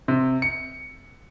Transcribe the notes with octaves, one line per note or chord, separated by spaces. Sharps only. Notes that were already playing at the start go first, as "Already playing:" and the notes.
C3
C#7